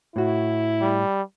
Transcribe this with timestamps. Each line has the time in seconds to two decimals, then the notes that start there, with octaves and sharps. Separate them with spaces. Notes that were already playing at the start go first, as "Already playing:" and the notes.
0.16 A2 E4 F#4
0.81 G3